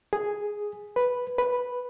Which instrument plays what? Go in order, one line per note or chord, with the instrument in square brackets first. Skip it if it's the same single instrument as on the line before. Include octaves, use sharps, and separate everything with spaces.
[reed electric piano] G#4
B4
B4